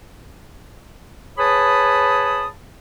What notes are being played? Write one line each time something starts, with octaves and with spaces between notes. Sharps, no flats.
G#4 B4 C#5 A5 B5 D#6